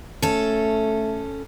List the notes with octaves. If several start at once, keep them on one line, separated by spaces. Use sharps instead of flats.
A3 C#4 A4